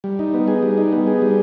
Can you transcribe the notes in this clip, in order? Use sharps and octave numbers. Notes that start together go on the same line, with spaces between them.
G3
D#4
B3
G#4
G3
D#4
B3
G#4
G3